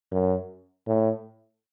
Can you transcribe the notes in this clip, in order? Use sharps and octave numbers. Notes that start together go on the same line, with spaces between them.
F#2
A2